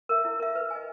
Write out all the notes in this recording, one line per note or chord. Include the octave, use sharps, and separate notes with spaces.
A#4 E5
E4
A#4 E5
B4
D#5 G#5